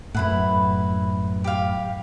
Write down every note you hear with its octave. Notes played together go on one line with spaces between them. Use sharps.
F#2 A2 E4 B4 F#5
G4 F5